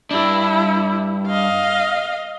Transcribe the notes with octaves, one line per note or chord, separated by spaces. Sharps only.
G2 D4 E4
D#5 F5